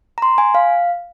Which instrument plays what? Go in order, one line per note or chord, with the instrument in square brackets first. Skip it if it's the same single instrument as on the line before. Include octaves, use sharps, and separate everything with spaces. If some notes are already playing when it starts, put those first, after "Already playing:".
[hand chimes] A#5
C6
G#5
F5